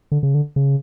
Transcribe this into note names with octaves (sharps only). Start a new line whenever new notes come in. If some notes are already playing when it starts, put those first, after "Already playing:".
D3
C#3
D3
C#3